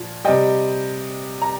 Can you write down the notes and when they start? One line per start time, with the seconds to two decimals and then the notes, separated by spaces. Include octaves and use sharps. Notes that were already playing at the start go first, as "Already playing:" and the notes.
Already playing: A#2 F3
0.24 C3 G3 D#5 G5
1.42 A#5